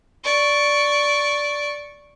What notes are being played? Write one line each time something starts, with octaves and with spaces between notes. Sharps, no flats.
D5 C#6